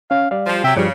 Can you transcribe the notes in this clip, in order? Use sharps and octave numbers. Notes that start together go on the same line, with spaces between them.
C#4 F5
G3 D5 F5
F3
C3 F#3 E5 G5
G2 C#3 F3 G3